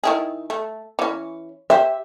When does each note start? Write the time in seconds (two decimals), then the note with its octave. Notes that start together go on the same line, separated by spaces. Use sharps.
0.04 D#3 E4 G#4
0.50 A3
0.99 E3 C#4
1.70 G4 C5 E5